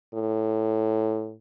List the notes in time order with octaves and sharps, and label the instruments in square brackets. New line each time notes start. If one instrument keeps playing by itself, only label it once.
[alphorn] A2